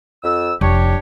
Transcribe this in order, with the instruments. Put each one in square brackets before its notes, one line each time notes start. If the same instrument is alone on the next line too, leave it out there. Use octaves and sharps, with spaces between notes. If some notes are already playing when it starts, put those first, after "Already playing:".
[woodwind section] F2 E6
[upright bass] F1 F3 [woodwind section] D4 G4 C#5